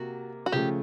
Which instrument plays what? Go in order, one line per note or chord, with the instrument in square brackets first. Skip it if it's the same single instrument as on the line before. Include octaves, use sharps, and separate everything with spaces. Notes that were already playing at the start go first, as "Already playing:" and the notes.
Already playing: [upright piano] C3 A#3 [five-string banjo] F#4
[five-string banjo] F#4
[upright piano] C#3 F3 A3 [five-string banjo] G4